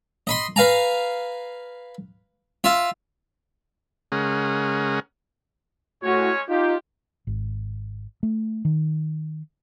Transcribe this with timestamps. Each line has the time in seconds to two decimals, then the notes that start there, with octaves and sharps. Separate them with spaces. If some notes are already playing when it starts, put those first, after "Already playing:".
0.27 D#5 B5 C6
0.56 B4 F5 G#5 A#5
2.64 F4 E5
4.12 C#3 G#3 C#4 G#4 A#4 F#5
6.02 A2 G#3 C#4 F#4 C#5
6.49 D#4 F4 G4
7.27 G#1
8.23 A3
8.65 D#3